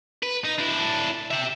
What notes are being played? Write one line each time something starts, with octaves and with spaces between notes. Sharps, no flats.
B4
D#4
D4 E4
G4 E5